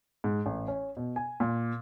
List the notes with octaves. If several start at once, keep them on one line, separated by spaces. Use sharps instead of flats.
G#2
A1
C#4
B2
G#5
A#2